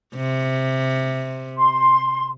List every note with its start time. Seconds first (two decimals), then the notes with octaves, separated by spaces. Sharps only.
0.16 C3
1.57 C6